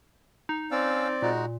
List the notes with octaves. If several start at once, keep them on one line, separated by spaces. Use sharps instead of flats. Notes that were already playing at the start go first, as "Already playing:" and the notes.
D#4
C4 C#4 D5 F5 E6
A#2 G#3 D#4 F#4